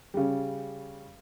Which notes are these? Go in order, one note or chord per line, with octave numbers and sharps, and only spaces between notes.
C#3 G3